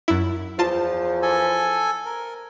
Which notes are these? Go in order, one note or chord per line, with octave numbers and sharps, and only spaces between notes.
F#2 E4
E2 F3 F4 A5
A4 G#5
A#4